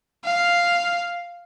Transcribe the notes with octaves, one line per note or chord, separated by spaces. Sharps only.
F5